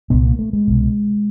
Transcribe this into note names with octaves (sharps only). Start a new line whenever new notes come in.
C2 A#2 B3
A#3
A3
G#3
C2 B2